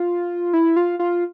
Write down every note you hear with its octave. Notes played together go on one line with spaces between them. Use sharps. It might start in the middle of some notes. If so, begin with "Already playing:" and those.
Already playing: F4
E4
F4
F4